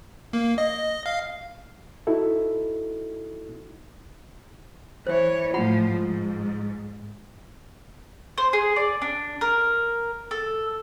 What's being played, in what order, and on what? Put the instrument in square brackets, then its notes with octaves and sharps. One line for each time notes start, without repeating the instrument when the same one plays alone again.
[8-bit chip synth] A#3
D#5
F5
[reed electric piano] D#4 E4 F#4 A4
[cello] E3 C#5 [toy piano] C5 E5
[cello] A2 F3 [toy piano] F4 F#5 B5
[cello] G#2
[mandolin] C5
G#4
D5
D4
A#4
A4